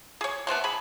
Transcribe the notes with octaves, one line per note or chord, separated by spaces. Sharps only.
G#4 C#5
A3 B3 C5 C6
G#4 B5